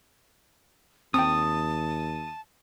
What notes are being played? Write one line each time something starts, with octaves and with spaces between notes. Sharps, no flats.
D#2 C4 G5 A5 D#6